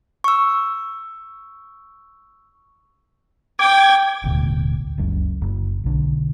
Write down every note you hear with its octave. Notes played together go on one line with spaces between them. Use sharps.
C#6 E6
G5 D6 G#6
D#1 A1 D2 B2
F#1 C#2 F#2
F#1
B1 D3